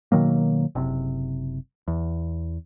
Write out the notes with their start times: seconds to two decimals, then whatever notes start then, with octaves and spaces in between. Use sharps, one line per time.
0.12 B2 D#3 F#3 A#3
0.75 F#1 C3
1.88 E2